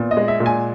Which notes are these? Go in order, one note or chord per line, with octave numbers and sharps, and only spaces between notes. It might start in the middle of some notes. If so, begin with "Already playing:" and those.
Already playing: A#2 B3
D#5
G#3
E5
A#2
G#5